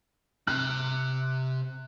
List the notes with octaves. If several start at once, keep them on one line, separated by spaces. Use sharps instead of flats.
C3 F#6